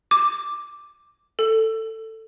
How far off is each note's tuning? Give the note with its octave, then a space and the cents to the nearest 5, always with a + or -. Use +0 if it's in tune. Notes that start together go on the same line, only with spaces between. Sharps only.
D6 +5
A4 +15